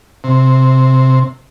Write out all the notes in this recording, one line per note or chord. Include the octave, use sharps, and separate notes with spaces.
C3